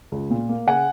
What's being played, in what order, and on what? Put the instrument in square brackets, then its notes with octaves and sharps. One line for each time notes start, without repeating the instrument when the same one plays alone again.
[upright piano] C#2
A#2
A#3
C#3 F#5 G#5